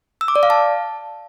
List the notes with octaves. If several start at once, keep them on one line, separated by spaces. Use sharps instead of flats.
E6
D6
D5
F5
A5